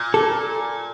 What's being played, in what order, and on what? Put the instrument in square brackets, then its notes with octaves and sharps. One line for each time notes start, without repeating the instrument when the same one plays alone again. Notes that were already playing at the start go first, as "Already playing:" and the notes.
Already playing: [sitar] A#2
[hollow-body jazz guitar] A4